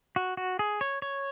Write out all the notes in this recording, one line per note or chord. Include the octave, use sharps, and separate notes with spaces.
F#4
F#4
G#4
C#5
C#5